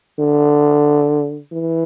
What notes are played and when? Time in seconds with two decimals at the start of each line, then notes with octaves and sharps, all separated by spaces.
0.19 D3
1.52 E3